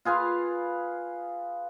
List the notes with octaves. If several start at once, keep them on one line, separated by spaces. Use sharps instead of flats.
F4 G#4 B4 F5